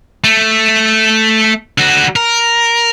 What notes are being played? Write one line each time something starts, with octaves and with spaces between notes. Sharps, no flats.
A3
D3 F#4
A#4